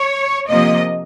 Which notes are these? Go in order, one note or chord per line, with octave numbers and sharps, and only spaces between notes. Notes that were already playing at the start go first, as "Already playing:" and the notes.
Already playing: C#5
C3 F3 A#3 D#5